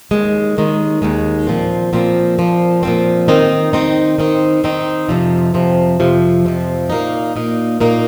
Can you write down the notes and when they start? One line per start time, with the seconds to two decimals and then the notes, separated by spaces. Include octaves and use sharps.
0.11 D#2 D#3 G#3
0.57 D#2 D#3 G#3
1.02 D#2 D#3 G#3
1.47 A#2 F3 C4
1.93 A#2 F3 C4
2.38 A#2 F3 C4
2.83 A#2 F3 C4
3.28 D#3 C4 D#4
3.73 D#3 C4 D#4
4.18 D#3 C4 D#4
4.64 D#3 C4 D#4
5.09 F2 C3 F3
5.54 F2 C3 F3
6.00 F2 C3 F3
6.45 F2 C3 F3
6.90 A#2 A#3 D#4
7.36 A#2 A#3 D#4
7.80 A#2 A#3 D#4